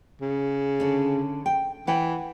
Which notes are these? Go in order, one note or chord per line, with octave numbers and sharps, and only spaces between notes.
C#3
D3 C#4
G5
E3 B4 F#5 G5